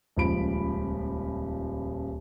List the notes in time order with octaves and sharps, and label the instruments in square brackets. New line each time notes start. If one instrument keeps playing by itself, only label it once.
[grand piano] D#1 C#2 F3 B5 D7